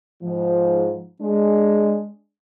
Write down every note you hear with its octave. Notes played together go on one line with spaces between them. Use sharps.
G#2 F3
G#3 D4